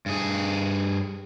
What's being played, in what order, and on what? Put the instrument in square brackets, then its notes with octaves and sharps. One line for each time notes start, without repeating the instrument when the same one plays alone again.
[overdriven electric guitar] G2 G#4